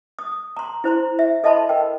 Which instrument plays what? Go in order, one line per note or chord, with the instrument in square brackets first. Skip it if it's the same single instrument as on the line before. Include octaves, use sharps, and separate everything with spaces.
[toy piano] D#6
A#5 C6
E4 C5 A#5 C6
E5
A4 D#5 E5 A5 B5 C6
A#4 G5